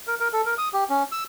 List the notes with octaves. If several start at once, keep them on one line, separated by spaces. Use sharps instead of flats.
A#4
A#4
A4
A#4
D#6
G4
C#4
E6